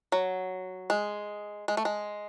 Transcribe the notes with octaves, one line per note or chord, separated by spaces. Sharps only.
F#3
G#3
G#3
A3
G#3